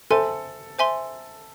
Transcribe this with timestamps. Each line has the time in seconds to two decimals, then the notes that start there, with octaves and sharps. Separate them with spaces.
0.10 A4 C5 E5 G#5 C6
0.79 C5 E5 G#5 C6